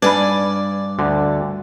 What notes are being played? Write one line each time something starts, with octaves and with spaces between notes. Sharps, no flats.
G2 D4 B4 D5 G#5 B5
D2 D3